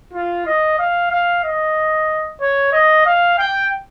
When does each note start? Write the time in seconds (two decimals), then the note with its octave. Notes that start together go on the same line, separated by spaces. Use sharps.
0.13 F4
0.46 D#5
0.79 F5
1.11 F5
1.43 D#5
2.41 C#5
2.72 D#5
3.06 F5
3.38 G5